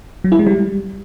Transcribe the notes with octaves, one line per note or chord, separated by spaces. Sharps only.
F#3
E4
G#3
G3